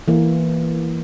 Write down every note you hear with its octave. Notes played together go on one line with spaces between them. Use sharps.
E3 A#3